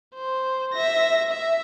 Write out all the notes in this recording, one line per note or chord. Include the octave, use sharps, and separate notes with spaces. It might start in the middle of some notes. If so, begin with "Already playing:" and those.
C5
E5 A#6
E5